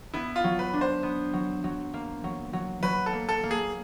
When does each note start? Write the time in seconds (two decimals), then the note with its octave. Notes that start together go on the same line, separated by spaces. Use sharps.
0.14 B3 E4
0.36 F4
0.44 F#3
0.59 B4
0.73 D4
0.81 C5
1.03 B3
1.33 F#3
1.64 F#3
1.94 A#3
2.24 F#3
2.53 F#3
2.83 F#3 B4
3.06 A4
3.13 A#3
3.29 A4
3.43 A#3
3.51 G#4